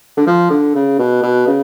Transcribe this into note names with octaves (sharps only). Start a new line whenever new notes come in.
D3
F3
D3
C#3
B2
B2
C#3